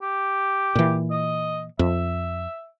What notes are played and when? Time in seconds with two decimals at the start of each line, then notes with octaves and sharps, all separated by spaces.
0.02 G4
0.75 A#2 E3
1.11 D#5
1.79 F2 E5